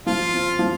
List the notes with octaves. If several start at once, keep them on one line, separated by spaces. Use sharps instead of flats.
F3 F4
C4
F3